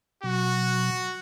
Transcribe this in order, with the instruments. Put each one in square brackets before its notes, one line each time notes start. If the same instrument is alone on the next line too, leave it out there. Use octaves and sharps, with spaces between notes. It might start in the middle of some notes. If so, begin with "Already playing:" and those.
[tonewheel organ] B2 F#3 [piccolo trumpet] F#4